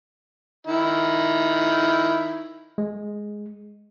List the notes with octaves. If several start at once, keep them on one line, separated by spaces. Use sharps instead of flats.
D#3 E4
G#3